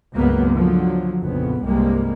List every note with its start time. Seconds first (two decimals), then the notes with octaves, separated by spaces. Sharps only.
0.15 C#2 G2 F#3 A#3 B3
0.56 D3 F3 F#3
1.23 A#1 F2 C#3 B3
1.65 C2 G2 G3 G#3 A#3